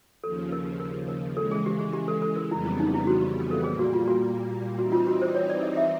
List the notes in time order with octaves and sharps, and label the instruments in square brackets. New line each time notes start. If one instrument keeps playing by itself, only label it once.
[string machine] D#2 C#3 F3 [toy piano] A4
[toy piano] A#4
A#4
A#4
[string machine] C#3 E3 G#3 [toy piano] A4
[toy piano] G#4
G4
G#4
G4
A4
A4
A#4
[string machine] F2 C#3 E3 G3 B3 [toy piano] E4
[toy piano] E4
D#4
E4
F#4
G4
A4
[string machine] A#2 G3 A#3 [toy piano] G#4
[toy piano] F#4
F4
F#4
[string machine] E3 G3 C4 D#4 [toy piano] F#4
[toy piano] F4
F#4
C5
C#5
D5
D#5
E5